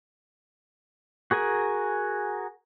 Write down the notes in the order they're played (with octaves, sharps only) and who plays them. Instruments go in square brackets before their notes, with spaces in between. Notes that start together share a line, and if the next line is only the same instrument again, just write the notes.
[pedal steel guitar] F#4 G#4 A#4 G#5